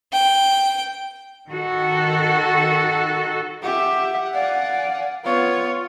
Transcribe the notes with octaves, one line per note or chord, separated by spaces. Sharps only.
G5
D#3 F#4 A4
G4 E5 F#5
D5 F5 G#5
B3 F4 C#5 F5